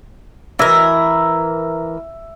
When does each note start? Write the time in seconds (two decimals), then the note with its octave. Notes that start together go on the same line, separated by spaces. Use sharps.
0.59 E3 A#4 E5